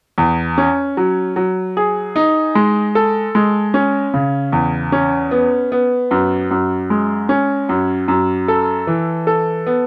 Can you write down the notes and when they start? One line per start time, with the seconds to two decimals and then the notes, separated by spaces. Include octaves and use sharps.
0.18 E2
0.58 C#4
0.97 F#3
1.36 F#3
1.77 G#4
2.16 D#4
2.55 G#3
2.95 A4
3.35 G#3
3.74 C#4
4.14 C#3
4.52 E2
4.92 C#4
5.31 B3
5.72 B3
6.11 F#2
6.51 F#2
6.90 G#3
7.29 C#4
7.69 F#2
8.08 F#2
8.48 A4
8.87 E3
9.27 A4
9.67 B3